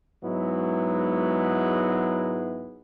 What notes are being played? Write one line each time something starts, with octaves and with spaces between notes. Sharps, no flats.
G#2 F#3 G#3 B3 E4